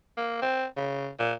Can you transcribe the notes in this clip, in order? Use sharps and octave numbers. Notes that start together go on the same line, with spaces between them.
A#3
C4
C#3
A#2